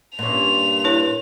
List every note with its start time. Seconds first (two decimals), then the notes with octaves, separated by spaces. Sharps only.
0.19 G2 A#2 C#4 F7
0.84 E4 B4 C#5